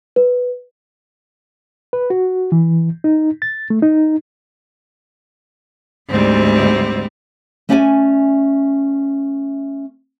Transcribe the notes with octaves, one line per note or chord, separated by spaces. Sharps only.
B4
B4
F#4
E3
D#4
A6
A3
D#4
D2 G#2 G3 C4
A3 C#4 D5 E5 F#5 G#5